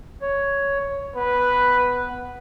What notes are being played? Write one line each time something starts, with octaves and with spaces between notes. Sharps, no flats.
C#5
B3 B4